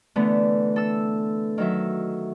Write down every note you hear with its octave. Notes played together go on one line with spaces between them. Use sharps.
D3 E3 A3 B3
A4 E6
D#3 F#3 E5